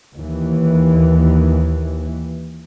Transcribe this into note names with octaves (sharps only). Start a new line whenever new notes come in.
D#2 E3